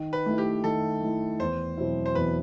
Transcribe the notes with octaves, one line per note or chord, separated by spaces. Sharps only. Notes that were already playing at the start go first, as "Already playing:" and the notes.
Already playing: D#3
B4
A3 E4
G4
D#3 A4
A3 E4
E2 C5
B2 F#3 C4 E4
C5
E2 B4